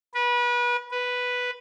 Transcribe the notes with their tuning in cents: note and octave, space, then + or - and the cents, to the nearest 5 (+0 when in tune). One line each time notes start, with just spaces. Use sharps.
B4 -30
B4 +0